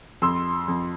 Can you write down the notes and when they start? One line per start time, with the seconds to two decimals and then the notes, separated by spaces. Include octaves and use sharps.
0.22 F2 C6 E6
0.68 F2